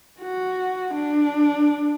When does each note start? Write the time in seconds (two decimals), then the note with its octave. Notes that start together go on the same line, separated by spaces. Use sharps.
0.21 F#4
0.94 D4